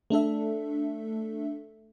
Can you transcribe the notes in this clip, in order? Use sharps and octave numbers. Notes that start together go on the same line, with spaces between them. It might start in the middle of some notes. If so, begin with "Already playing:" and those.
A3 D4 A4 E5